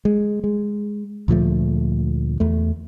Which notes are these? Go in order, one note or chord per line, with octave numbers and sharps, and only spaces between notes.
G#3
G#3
D2 A#2 F3 A3
E2 A3